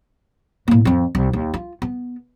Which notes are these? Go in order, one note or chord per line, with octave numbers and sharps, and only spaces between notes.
A2 A#3
F2 C4
C2
D#2
F4
B3